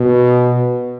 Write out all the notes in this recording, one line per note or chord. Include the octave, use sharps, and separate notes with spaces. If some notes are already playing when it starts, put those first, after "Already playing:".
Already playing: B2